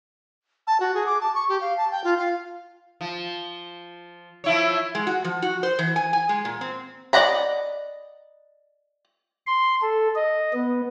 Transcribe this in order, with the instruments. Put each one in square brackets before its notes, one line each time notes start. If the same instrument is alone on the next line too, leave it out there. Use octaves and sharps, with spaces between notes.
[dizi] A5
F#4
G#4
D6
A5
C#6
G4
F5
A5
G5
F4
F5
[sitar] F3
F3 E4 C#5
[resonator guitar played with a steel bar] G#3
F#4
F3
F#4
C5
E3
G#5
G#5
G#3
A#2
C4
[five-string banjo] D5 D#5 F#5 A#5 B5
[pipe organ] C6
A4
D#5
B3